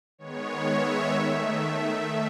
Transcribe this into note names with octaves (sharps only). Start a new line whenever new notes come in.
D#3 G#3 B3 C#5
E5
D#3 A3